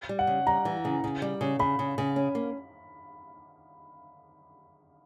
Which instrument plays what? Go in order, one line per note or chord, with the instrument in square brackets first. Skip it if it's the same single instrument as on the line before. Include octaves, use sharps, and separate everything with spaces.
[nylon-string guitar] G3
[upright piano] F#5
[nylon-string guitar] C#3
[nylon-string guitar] G3 [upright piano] A#5
[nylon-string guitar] E3
C#3
C#3
G3
C#3
[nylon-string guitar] C#3 [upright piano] B5
[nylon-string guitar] C#3
C#3
C#4
A#3